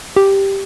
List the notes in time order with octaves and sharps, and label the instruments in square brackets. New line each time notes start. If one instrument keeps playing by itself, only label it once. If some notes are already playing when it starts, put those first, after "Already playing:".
[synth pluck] G4